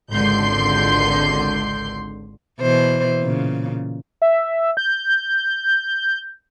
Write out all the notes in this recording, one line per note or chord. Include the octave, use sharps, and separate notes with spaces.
G#1 C#2 D3 C6 G6
B2 E3 C5
A#2 C#3
E5
G6